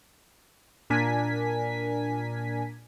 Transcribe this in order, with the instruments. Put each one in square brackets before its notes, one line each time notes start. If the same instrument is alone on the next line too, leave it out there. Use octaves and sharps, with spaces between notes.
[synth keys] A#2 D4 A#4 G#5 B6